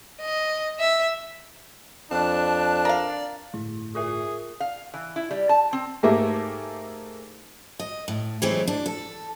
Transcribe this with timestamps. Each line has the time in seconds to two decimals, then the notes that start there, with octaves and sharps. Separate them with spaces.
0.21 D#5
0.80 E5
2.11 F2 D4 A5 F#6
2.85 A#4 D5 F5
3.54 G1 A2 A3 E4
3.95 F4 G#4 A#4 E5
4.60 F5
4.94 E3
5.16 E4
5.31 G3
5.49 A5
5.73 C4
6.03 G#2 A3 A#3 G4 E5
7.79 D#5
8.08 A2
8.42 E3 F#3 G#3 A3 C4 E4
8.67 D4
8.86 A4